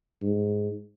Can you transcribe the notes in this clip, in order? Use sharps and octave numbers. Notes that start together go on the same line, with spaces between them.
G#2